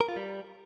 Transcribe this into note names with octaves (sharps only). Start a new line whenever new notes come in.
A#4
F4
G3